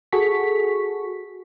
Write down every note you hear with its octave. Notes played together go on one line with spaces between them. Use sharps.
F#4 G#4 A4 C#6 B6